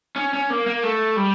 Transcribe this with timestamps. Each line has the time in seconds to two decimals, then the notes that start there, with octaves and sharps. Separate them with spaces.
0.16 C#4
0.33 C#4
0.50 A#3
0.67 A#3
0.83 A3
1.16 G3